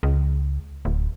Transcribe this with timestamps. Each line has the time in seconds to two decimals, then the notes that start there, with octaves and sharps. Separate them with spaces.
0.03 C#2
0.85 D1